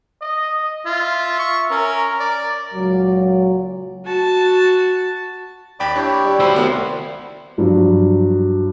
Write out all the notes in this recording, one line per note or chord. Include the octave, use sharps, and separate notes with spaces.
D#5
F4 E5
C#6
C#4 A#4
D5
C#2 A#2 F#3
F#4 A5
D#2 D5 G5 B5 D6
D4 E4 G4 C#5
G3
F#4 C5 B5 E6
C2 B3
G2 F3 F#3